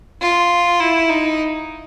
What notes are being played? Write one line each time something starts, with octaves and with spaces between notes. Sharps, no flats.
F4
E4
D#4